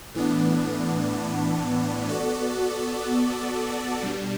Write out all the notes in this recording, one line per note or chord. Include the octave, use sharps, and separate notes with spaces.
A2 E3 B3 D4
B3 F#4 A4 D5
B2 G3 D4